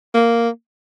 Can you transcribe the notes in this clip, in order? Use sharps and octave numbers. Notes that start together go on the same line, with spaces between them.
A#3